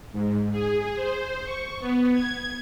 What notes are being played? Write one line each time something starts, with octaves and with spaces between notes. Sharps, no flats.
G#2
G#4
C5
C#6
B3
G#6